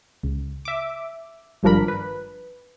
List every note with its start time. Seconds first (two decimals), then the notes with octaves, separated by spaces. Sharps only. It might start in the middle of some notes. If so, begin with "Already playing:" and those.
0.23 C#2
0.65 E5 D6
1.63 G#1 G2 F3 D4 A#4 B5
1.88 B4